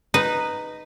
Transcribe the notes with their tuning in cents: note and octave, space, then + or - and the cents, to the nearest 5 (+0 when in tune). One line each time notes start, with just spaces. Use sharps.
D#4 -10 B4 +0